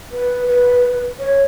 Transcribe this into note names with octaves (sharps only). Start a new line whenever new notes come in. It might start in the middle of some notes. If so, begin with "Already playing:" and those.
B4
B4
C#5